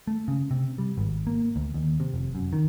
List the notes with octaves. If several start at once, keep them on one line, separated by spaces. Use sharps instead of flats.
A3
C#3
C3
G3
G#1
A#3
D2
D#2
C3
F1
F#2
D#3